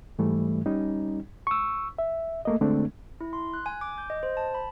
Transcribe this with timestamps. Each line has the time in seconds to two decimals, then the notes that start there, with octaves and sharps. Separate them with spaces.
0.19 G#2 E3 G3 A3
0.66 G3 C#4 D#4
1.47 C#6 E6
1.98 E5
2.45 A3 A#3 D#5
2.61 D3 G#3 A3 C4 D4
3.21 E4
3.33 C6
3.54 F#6
3.66 G#5
3.81 D6
3.98 G6
4.10 D#5
4.23 C5
4.37 A5
4.54 B5